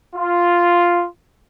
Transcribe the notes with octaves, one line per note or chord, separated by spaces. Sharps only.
F4